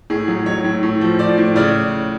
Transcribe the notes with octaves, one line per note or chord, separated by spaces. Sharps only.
A2 G#4
F#3
F#3 C#5
A2
A2
F3
F3 D5
A2
C#3 D5